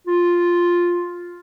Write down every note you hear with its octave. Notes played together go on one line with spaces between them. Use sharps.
F4